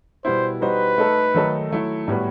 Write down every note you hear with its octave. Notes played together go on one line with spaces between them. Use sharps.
B2 G3 B3 E4 C5
G3 D#4 F#4 B4 C5
A3 D#4 A4
D#3 F#3 A3 D#4 A4
F#3 A3 E4
A2 G3 B3 F#4 B4